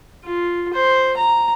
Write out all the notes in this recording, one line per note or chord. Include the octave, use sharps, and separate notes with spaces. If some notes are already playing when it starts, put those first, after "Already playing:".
F4
C5
A#5